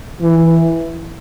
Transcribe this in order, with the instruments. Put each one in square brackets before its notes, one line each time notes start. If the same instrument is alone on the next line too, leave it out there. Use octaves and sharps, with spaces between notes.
[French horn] E3